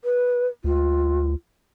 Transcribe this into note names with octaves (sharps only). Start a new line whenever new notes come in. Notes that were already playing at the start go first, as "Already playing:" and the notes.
B4
D2 F4